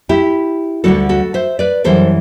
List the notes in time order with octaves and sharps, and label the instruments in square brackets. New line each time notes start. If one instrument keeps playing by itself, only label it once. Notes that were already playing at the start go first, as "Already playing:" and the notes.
[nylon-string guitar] E4 G4
D2 D3 G3 F#4 A4
F#4 A4
C5 E5
B4 D5
F#2 E3 G3 A4 C5